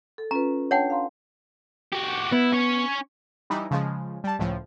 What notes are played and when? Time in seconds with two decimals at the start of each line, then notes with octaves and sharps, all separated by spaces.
0.18 A4
0.31 C#4 F4 B4 A#5
0.71 D4 C#5 F#5 G5 A5
0.90 F5 A#5 C6
1.93 F#4 G4
2.32 B3 E4
2.53 C#4 C#5
3.50 E3 G3 D#4 E4
3.71 C#3 F3 G#3
4.24 G3 A5
4.39 C#2 A2 F3